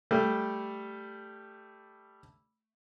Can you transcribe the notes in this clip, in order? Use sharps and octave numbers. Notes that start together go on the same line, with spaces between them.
G3 A3